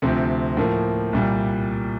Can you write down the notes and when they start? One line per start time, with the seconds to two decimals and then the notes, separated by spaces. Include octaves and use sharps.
0.02 D2 C3 F3 C4
0.57 A2 F3 A#3
1.13 C2 A#2 G3